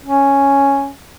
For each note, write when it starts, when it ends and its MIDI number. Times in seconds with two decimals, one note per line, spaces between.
0.05 0.92 61